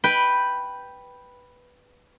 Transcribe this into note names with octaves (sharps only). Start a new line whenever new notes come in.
B4 G5